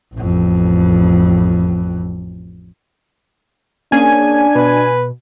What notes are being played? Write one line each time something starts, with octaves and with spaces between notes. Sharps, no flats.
A1 F2
A#3 C#4 D4 G#4 G#5
B2 B4